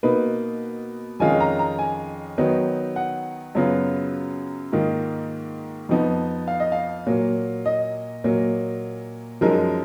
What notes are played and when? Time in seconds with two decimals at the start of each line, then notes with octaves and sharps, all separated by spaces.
0.03 B2 A#3 D#4 B4
1.20 F2 D#3 G#3 C#4 F4 G#5
1.40 A#5
1.59 A#5
1.79 G#5
2.38 D#3 F#3 B3 D#4
2.96 F#5
3.55 F#2 C#3 F#3 B3 F4
4.72 G#2 D#3 A#3 F4
5.89 F2 F3 B3 D#4
6.48 F5
6.60 D#5
6.72 F5
7.06 A#2 F#3 A#3
7.66 D#5
8.24 A#2 F#3 A#3
9.41 F#2 F3 G#3 D#4 A#4